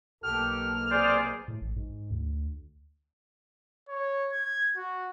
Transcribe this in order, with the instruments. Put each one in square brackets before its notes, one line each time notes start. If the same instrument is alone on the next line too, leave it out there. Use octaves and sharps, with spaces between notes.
[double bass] B1 A#3 [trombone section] G4 A4 [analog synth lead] F6
[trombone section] C3 G#4 [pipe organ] C5 D5
[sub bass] A2
A1
G#2
D2
[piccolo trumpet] C#5
G#6
F#4